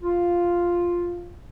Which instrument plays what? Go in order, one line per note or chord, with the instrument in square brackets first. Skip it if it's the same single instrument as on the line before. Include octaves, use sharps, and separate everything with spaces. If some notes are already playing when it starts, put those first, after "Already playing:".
[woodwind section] F4